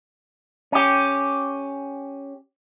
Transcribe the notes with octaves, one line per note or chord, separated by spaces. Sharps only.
C#4 G4